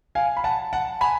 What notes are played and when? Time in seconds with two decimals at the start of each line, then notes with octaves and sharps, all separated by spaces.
0.15 F5 G#5
0.37 B5
0.44 F#5 A5
0.73 F#5 A5
1.01 G#5 B5